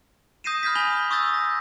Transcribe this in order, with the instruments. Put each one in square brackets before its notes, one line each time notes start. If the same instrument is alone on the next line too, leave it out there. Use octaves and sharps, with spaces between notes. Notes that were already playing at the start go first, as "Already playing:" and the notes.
[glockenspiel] D#6 G6 A#6 C7 D#7 E7
B5 F6 G6 G#6 B6
G#5 B5 D#6 G#6 F7 G7
C#6 D#6 E6 G6 A6
A#6